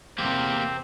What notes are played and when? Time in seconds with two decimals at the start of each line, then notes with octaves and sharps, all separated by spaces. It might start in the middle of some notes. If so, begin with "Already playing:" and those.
0.18 E2 C3 A#3 C4 G4